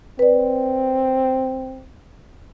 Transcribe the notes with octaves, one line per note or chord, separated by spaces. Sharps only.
C4 B4 D5